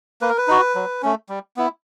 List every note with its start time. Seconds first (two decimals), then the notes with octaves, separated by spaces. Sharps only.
0.21 A#3 B4
0.29 A#4
0.38 B4
0.48 D#4 F#4
0.75 F#3
1.02 A3 C#4
1.29 G3
1.57 B3 E4